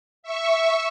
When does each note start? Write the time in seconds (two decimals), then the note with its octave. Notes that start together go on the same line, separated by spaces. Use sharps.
0.23 E5 C#6